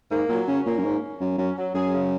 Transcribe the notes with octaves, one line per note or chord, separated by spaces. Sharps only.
G#2 A#3
A#2 F#3
C#3 C#4
A#2 A#3
F#2
G#2 C#4
A#3
F#2 F#3
F#2 C#4
F#3
F#2 G#4
C#3